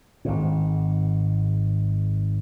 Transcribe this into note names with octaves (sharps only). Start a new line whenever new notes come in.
G#1 G#2